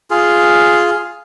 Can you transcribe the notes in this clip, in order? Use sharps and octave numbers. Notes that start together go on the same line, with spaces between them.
F4 G#4